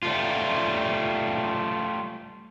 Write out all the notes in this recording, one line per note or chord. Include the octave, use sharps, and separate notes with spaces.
G3 A3 F4